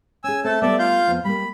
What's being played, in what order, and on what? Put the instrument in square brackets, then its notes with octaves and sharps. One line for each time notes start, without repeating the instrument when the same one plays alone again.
[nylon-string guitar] C#4 G#4 [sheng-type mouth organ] G#5 E6
[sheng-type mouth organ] A3 A4 A5 [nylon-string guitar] C4
[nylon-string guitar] G3 A3 B3 [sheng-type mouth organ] A4 D5 E5
[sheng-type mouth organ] F4 F5 G6
[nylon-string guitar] F2 B3
[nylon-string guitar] G3 A#3 [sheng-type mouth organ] B5